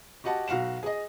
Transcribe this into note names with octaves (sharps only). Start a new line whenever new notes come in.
F#4 G4 D#5 F#5 A5
B1 F#4 F5 F#5 E7
G#4 D#5